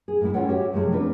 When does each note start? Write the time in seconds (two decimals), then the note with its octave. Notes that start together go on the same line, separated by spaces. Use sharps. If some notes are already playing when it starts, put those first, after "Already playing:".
0.08 G#4
0.21 A2 G#3 E4
0.33 C#4 F4 A4 C#5 F#5 G5
0.48 F#4 G4 C#5 E5
0.73 C3 F3 G#3 A3
0.92 C4 D4 F4 B4